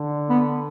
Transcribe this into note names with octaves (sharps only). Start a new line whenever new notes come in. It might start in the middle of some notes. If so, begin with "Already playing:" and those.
Already playing: D3
B3